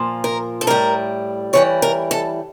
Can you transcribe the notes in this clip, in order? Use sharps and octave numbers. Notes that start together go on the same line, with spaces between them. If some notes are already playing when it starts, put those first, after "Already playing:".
Already playing: A#2 F3
A#4
A4
A2 G3 A#4
A2 E3 G3 C#5
A#4
A4